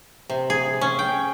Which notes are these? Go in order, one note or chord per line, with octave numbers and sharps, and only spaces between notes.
C3
G#4
C#4
G5